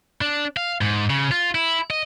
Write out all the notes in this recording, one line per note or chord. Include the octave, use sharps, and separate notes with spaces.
D4
F5
G#2
C#3
F4
E4
D#5